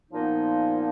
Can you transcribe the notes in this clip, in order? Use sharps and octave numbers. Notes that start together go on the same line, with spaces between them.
A#2 F3 B3 D#4